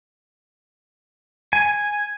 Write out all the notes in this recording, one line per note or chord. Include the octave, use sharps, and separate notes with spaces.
G#5